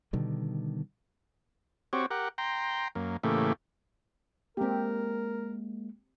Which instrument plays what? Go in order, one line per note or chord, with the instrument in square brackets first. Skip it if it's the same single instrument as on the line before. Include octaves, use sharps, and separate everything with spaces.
[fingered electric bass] B2 D3 D#3 G3
[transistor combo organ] C4 F#4 G4 C#5
G4 A#4 F#5
G5 A#5 C6
F#2 A#3
A2 C#3 E3 A3 A#3 G4
[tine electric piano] G#3 A#3 [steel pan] C4 G4 [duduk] A#4